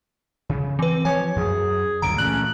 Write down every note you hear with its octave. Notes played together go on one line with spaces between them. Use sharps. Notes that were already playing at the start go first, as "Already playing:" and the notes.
C#3
E3 C4 B4
F3 C#5 G#5
F#2 G#4
C#2 F#2 D3 A#5 D7
A#2 E3 A3 C#4 F#6 F#7